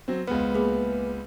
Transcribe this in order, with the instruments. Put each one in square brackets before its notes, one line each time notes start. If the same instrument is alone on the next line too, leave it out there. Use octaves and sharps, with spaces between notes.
[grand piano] F#3 C4
[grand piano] C#2 B3 [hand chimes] B4
[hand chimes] A#3 G#4 B4